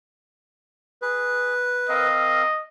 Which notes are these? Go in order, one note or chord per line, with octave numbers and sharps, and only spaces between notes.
G#4 B4
C4 A#4 D#5 F5